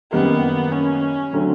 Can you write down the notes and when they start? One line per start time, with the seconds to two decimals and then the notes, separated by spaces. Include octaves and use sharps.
0.12 F#2 D#3 G3 A#3 B3
0.72 C#4
1.33 D3 F#3 A3 C4